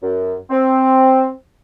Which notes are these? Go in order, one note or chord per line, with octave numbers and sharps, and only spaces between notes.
F#2
C4